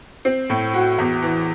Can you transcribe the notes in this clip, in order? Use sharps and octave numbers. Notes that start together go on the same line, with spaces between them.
C4
A2
F#4
E2
E3